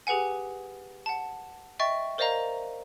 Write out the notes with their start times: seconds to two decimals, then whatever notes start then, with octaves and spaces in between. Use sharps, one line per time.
0.07 G4 G#4 B4 F#5 G#5
1.06 F#5 A5
1.79 D#5 E5 G5 C#6 A6
2.18 A#4 C5 D5 D#5 F5 A#5